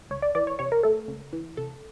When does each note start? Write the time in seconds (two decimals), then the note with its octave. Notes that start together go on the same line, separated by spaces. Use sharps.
0.11 C#2 C#5
0.22 D5
0.35 E3 D5
0.47 C#5
0.59 C3 C#5
0.72 A#4
0.83 A3 A4
1.08 C#2
1.33 E3
1.57 C3 A4